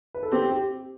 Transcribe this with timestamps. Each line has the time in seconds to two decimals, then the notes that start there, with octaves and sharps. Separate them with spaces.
0.14 B4
0.23 A4
0.32 C4 G4
0.52 G4